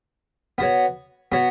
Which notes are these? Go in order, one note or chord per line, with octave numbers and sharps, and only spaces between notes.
B3 F#4 C#5
B3 F#4 C#5